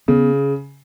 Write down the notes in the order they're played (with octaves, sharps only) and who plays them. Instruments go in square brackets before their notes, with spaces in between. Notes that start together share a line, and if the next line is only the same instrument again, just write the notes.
[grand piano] C#3 [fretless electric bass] B3